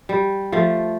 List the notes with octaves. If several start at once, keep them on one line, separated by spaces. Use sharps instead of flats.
G3
F3 A3